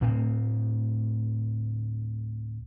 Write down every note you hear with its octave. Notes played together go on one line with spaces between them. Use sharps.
D2 A2 C4